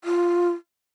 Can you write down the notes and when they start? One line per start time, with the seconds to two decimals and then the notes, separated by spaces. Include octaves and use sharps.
0.04 F4